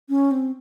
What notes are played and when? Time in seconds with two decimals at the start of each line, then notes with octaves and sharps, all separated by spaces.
0.09 C#4
0.31 C4